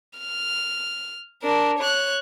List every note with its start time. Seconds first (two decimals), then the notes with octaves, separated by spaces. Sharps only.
0.19 F6
1.43 D4 A#4
1.79 C#5 F#6